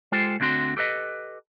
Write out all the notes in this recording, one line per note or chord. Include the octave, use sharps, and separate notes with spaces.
G#3 F4 G4 A4 C5
D2 D3 C4 F#4 C6
G4 A4 B4 D#5